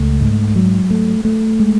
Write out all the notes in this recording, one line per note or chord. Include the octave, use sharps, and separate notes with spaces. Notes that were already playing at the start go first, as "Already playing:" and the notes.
Already playing: C#2 A3
G#2
F#3
A3
A3
G#3